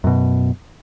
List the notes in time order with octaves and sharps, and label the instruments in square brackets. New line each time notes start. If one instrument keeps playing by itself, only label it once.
[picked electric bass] F#2 B2